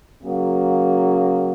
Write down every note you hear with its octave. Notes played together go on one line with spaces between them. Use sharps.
C#3 F#3 A#3